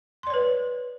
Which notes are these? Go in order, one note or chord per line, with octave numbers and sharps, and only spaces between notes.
B4 C#5 D5 C6